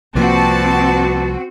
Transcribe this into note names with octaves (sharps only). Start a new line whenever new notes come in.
C2 F3 A#3 C4 F#4 B4 D5 A5